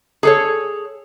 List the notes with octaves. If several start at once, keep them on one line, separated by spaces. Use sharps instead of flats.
G#4 A4 C#5